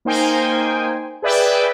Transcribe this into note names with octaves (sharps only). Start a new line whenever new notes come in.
A#3 D#4 C5 G5 G#5
G#4 B4 D5 E5 G5